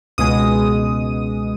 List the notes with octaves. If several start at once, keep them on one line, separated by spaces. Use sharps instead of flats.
C#2 B2 G#3 D#6